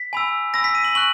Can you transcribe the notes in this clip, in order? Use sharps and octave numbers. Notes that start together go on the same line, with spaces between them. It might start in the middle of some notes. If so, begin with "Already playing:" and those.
Already playing: B6
G#5 B5 E6
G#5 B5 E6 A#6
B6
D#7
F#7
G#5 C#6 F#6 F#7